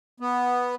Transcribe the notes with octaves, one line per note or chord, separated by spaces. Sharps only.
B3